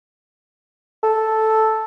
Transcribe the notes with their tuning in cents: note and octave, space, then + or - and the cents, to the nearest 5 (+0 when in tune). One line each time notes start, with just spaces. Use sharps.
A4 -5